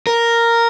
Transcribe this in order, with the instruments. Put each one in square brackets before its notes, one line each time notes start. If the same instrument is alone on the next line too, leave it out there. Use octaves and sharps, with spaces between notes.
[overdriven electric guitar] A#4